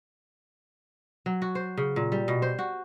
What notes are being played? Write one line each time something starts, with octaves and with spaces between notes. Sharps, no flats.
F#3
F#4
C5
C#3
A#2
G3
B2
C5
F#4